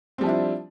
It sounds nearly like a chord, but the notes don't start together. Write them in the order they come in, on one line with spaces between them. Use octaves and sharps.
C4 G3 F3 E4 D4